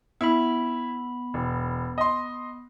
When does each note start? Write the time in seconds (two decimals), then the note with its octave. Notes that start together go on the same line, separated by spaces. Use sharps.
0.21 B3 E4 B5
1.34 E1
1.98 D#5 C6